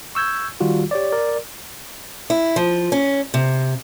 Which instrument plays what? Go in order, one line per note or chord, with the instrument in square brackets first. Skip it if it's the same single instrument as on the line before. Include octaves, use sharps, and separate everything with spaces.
[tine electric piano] C#6 E6 G6 G#6
D#3 G3 F4 F#4
G4 C#5 D5
A#4 D5
[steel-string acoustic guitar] E4
F3
C#4
C3